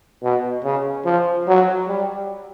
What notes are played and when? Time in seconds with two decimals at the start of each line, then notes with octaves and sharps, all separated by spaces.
0.23 B2
0.64 C#3
1.05 F3
1.47 F#3
1.88 G3